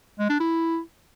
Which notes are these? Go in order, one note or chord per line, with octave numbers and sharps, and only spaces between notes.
G#3
D4
E4